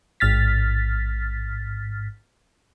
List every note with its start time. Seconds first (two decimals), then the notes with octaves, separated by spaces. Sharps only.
0.20 A1 G#2 F6 A6 B6